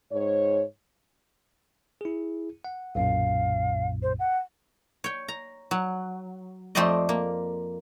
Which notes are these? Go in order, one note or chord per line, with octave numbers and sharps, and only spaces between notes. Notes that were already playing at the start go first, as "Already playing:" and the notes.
G#2 C#5
E4 G#4
F#5
B1 F#2 A#2 F5
C5
F#5
C#5 G5
A#5
F#3
F2 A3 G4 C5 D5 D#5
A#3